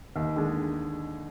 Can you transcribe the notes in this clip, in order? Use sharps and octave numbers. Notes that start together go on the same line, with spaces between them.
D#2
D3 G#3